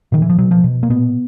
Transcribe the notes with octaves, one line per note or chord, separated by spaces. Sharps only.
A#2 D#3
E3
F3
B2 F#3
F3
B2
A#3
A#2 B3